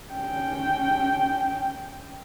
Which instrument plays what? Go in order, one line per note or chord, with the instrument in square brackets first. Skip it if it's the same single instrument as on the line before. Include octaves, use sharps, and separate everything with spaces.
[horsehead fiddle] C#4 G5